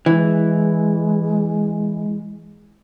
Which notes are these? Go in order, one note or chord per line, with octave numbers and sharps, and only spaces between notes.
E3 G#3